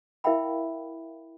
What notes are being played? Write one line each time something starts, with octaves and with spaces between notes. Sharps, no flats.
E4 A#4 E5 F5 G5 B5